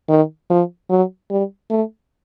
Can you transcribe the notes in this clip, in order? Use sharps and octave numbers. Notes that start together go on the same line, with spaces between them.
D#3
F3
F#3
G3
A3